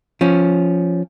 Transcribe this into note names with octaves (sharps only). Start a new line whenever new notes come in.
F3 C#4